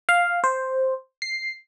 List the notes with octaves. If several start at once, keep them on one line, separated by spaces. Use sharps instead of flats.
F5
C5
C7